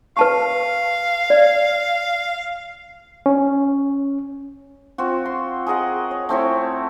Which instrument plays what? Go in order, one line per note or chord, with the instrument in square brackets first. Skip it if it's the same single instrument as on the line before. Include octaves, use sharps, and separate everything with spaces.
[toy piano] B4 A5 C#6 [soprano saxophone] F5
[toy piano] D5
[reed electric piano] C#4
[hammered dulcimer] C4 F4 F#4
C6
G#4 A#4 D#5 F#5
C#5
A3 C4 E4 C#5